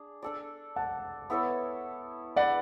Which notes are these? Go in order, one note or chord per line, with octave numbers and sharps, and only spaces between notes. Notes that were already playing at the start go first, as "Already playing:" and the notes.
Already playing: D4 G#4
D4 A4 D5
F#5 A5
B3 E4 A4 C#5
D4 G#4 B4 D5 F#5